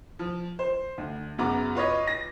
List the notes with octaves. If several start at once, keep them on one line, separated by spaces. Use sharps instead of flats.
F3
C5
D2
F#2 C#3 B3 F#4 A#5 D6
F4 B4 C#5 D#5
A#6